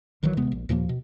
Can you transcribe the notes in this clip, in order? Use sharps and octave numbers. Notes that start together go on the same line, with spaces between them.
A#1 D#3 E3 F#3
D#1 C3 G#3 B3
A#1
D#2 A#2 F3 A#3
B2